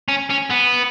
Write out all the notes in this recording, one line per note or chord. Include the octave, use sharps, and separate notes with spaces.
C#4
C#4
B3